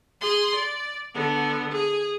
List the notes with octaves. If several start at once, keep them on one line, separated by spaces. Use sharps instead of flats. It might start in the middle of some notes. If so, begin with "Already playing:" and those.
G#4 C6
D5
D3 B3
G#4